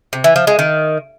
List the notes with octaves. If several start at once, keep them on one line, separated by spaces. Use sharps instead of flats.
C3
E3
F3
G#3
D#3